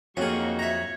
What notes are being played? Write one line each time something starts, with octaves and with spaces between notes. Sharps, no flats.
F2 F#3 A#3 C#4 D#4 F#4 G#4 C#6
C#5 E5 A#5